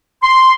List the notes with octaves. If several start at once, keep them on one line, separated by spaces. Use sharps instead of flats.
C6